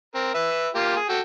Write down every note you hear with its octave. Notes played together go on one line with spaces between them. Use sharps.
C4 A#4
B4 E5
A#3 F4 G4
G#4
F#4 A4 G5